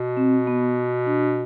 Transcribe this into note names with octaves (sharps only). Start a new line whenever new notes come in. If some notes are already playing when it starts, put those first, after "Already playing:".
Already playing: B2
C4
B3
D4